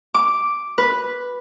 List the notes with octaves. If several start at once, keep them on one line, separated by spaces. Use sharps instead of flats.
D6
B4